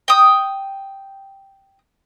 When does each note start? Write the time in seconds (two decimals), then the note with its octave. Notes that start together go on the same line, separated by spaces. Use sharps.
0.08 G5 D#6